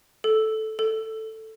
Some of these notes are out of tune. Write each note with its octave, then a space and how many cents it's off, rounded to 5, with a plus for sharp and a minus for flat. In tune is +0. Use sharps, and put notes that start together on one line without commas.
A4 -10
A4 +5